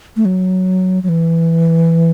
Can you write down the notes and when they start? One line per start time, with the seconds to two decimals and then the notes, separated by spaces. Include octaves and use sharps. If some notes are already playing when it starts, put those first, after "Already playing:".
0.16 A3
0.25 F#3
1.03 F#3
1.09 E3